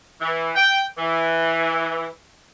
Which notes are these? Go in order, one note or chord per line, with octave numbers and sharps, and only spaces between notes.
E3
G5
E3